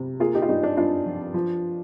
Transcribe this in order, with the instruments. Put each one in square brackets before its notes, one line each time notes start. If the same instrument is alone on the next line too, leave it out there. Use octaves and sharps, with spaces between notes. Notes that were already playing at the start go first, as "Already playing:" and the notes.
Already playing: [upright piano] C3
A#3 F4 G#4
D#4 G4
F4
G2 D#4 G4
D4
G2 D4 F4
F3
F3